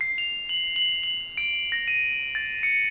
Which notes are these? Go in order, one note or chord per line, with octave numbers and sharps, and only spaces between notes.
C7
F7
F#7
F#7
F#7
D7
A#6
D#7
A6
C#7